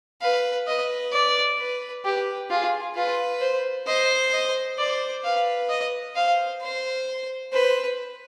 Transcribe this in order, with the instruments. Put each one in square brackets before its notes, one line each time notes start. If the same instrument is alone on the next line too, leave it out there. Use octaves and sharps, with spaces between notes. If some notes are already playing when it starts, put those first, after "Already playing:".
[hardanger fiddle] B4 [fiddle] F5
[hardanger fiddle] B4 [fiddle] D#5
[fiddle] D5
[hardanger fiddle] B4
[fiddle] G4 [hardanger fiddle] B4
[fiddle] F4 [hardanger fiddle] G#4
[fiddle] F4 [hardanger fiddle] B4
[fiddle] C5
[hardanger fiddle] C5 [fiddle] D#5
[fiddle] D#5
[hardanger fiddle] C5 [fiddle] D5
[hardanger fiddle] B4 [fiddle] F5
[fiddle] D#5
[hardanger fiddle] C5 [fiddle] F5
[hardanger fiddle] C5
[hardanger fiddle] B4 [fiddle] C5